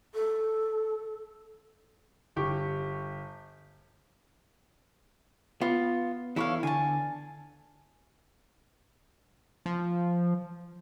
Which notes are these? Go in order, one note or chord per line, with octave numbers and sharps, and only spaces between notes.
A4
G1 G4 C#6
B3 F4
E2 E4 A4 C#5 F5
D3 G#5 A5
F3